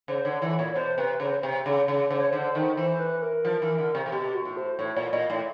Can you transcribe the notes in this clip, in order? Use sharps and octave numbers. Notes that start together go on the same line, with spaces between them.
C#3 C5
D3 C#5
E3
A#2 C#5
B2 C5
C3 B4
C#3 C5
C3
C#3
C#3
C#3 C5
C#5
D3 C5
D#3
E3 C5
B4
A#4
F3
E3
D3
C3
C3
B2 G4
F#4
A2
C5
A2 C#5
A#2 D5
A#2 D#5
A2